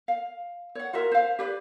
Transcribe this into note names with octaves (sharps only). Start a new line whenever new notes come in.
F5
C#5 F#5
F4 F#4 A#4 E5
C5 F5
G4 B4 D5